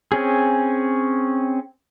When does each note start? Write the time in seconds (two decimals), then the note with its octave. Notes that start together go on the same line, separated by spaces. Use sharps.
0.12 C4 C#4 G#4